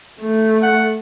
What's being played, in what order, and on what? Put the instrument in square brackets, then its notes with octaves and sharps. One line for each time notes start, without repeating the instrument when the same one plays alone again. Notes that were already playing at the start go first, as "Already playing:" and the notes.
[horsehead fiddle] A3
[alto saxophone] F#5